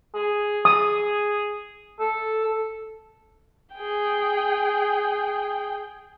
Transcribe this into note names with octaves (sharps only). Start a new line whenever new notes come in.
G#4
G#4 D#6
A4
G#4 G5